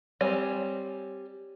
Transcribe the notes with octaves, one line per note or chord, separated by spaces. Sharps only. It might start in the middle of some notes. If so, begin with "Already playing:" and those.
G3 C4 C#5 G#5